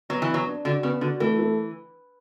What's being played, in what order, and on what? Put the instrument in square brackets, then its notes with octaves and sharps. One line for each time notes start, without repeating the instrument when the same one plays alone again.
[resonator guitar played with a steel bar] F#3 [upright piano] B3
[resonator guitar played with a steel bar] E3
[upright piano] B3
[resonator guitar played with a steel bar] F#3
[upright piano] D4
[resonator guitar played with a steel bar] D3 [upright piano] F#4
[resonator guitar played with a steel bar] C#3 [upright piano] B3
[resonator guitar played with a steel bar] D3 [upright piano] F#4
[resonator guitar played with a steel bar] E3 [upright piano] A3
[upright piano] A3